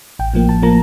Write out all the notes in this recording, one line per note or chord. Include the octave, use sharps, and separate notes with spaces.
A1 G5
A2 F3 A#3
A1 A5
A2 F3 A#3 A#5